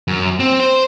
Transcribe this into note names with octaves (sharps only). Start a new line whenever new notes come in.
F#2
C4
C5